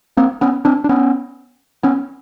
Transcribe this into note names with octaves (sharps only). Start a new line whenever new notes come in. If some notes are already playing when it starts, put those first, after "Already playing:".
A#3 C4
B3 C#4
C4 D4
D4
B3 C#4
B3 C#4